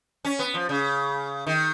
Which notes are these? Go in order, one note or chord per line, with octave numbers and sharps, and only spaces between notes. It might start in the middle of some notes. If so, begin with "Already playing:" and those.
C#4
B3
F3
C#3
D#3